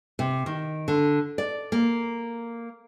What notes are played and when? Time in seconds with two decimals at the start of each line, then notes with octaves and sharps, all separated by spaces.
0.19 C3
0.46 D#3
0.88 D3
1.38 D5
1.72 A#3